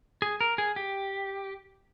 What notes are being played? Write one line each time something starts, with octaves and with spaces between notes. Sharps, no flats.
G#4
A#4
G#4
G4